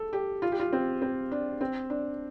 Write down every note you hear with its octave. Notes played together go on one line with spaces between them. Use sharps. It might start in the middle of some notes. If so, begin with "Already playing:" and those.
Already playing: A4
G4
F4
G4
F4
C4
C4
D4
C4
D4